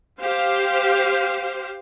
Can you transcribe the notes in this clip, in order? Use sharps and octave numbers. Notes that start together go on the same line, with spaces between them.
G4 C5 F5